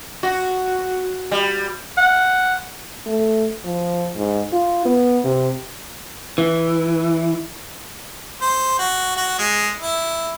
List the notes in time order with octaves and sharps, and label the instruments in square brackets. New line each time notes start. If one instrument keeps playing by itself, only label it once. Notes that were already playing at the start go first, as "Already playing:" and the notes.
[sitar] F#4
G3
[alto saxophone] F#5
[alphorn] A3
F3
G#2
F4
B3
C3
[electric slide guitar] E3
[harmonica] C5
F#4
F#4
G#3
E4